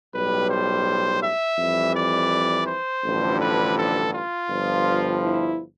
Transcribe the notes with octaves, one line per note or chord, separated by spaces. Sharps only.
B1 A2 G3 B4
C5
E5
F2 E3 G3
D5
C5
A1 G2 D3 F3
B4
A4
F4
G1 G2 F3
E4